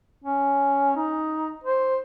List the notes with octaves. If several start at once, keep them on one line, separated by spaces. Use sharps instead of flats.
C#4
D#4
C5